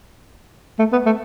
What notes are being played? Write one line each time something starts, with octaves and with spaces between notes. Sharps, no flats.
A3
B3
A3